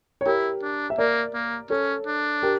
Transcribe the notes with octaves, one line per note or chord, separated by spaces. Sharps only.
C#5
E4 G4 A#4
D4
E5
A#3 A#4 D5
A#3
C#4 A4 C#5
D4
G4 A#4